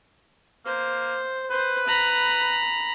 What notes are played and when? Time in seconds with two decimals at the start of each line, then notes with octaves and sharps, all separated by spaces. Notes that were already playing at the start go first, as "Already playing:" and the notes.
0.66 A#3 C5
1.51 B4 C5
1.87 A#5 B5